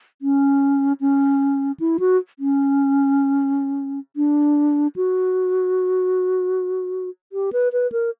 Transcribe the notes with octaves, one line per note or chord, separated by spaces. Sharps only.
C#4
C#4
E4
F#4
C#4
D4
F#4
G4
B4
B4
A#4